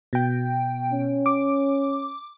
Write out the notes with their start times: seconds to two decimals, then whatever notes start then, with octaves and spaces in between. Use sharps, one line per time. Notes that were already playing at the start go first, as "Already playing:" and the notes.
0.13 B2 G5
0.93 C#4
1.26 D6